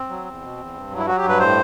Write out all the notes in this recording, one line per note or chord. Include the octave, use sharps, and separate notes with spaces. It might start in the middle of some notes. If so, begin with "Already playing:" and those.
Already playing: C4
F#3
E2
B2
E2
G2
F#3
E4
F#3 F#4
G4
G2
B4
A2 C5